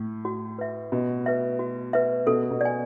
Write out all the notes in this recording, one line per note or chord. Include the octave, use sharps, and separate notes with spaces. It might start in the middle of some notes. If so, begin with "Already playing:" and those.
Already playing: A2
F#4
B4 E5
B2 F#4
B4 E5
F#4
B4 E5
B2 A4
B2
D5 G#5